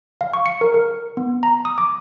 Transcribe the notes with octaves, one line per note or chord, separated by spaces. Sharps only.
F5
C#6
C#7
A#4
A#4
B3
A#5
D#6
D6